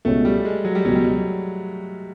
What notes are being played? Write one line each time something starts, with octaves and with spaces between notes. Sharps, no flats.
C#2 B2 G#3 A3 C#4
G3
G#3
F#3
G3
C#2 B2 F#3 G#3 C#4
G3
F#3